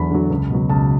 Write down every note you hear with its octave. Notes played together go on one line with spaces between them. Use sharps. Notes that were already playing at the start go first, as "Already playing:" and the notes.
Already playing: E2 D3 F#3 A5 B5
D3 F#3
C#2
B2 F#3
C#2 A5